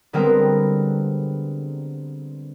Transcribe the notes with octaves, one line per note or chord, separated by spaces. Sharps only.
D3 G3 G#3 B3 C4 A#4